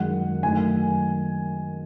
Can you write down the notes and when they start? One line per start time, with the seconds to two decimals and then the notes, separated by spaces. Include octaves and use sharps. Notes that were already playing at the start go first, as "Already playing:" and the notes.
Already playing: F#2 D#3 G#3 F#5
0.43 F#2 D#3 A3 G#5